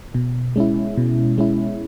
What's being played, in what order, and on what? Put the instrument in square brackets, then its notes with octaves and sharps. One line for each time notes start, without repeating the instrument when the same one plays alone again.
[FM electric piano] B2
G#3 C#4 E4
B2
G#3 C#4 E4